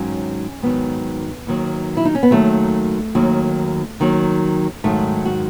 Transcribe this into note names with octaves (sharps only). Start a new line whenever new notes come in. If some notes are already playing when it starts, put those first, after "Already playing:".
Already playing: G#2 D#3 F#3 C#4
G#2 D#3 F#3 B3
D#2 D#3 F#3
E4
D#4
C#4
B3
D#2 D#3 F#3 A3
D#2 D#3 F#3
D#2 D#3 F#3
G#2 D#3 F#3 A3
F#4